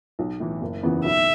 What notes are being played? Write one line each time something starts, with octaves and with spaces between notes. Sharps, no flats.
B1
A2 E3
F#1
E2 C#3 E3 B3
B1 E5